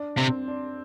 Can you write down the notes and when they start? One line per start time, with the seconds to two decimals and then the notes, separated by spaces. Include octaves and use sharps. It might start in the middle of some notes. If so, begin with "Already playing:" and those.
Already playing: D4
0.17 C3 C4
0.48 D4